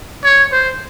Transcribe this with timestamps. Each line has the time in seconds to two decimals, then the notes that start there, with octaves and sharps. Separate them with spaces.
0.24 C#5
0.52 C5